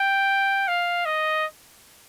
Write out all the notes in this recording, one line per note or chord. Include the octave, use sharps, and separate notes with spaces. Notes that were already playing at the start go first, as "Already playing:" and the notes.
Already playing: G5
F5
D#5